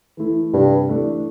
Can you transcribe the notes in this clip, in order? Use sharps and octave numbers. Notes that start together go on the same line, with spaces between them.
E3 A3 E4
G2 C3
E3 A3 D4